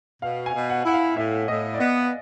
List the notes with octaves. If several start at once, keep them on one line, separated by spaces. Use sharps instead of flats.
B2 F5
G#5
B2
F#5
E4 F#5
F5
A2 E5
A2 D#5
D5
B3 D#5